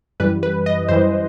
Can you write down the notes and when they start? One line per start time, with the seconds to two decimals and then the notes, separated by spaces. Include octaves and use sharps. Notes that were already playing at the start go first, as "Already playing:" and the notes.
0.20 F#2 E3 G3 B4
0.43 B4
0.66 D#5
0.88 F#2 E3 G3 C5